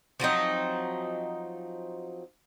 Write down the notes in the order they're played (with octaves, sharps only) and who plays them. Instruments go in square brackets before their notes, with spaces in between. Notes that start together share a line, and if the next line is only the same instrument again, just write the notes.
[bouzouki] F3 F#3 C4 D#4